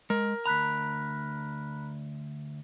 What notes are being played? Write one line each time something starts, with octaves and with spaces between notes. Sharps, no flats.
G#3 A#4
D2 A#5 B5 F#6 B6